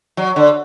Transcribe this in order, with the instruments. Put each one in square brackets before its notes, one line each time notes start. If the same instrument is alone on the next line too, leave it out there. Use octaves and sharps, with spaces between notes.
[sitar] F#3
D3